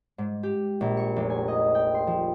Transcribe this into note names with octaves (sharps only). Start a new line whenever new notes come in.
G#2
G4
A#1
C#6
F1
G#5
D#5
G5
C6
F3